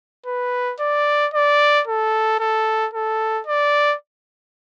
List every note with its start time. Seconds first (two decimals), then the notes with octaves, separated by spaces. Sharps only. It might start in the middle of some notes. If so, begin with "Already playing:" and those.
0.26 B4
0.80 D5
1.34 D5
1.87 A4
2.40 A4
2.94 A4
3.47 D5